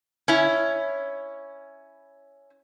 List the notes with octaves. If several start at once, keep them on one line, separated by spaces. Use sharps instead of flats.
C#4 E4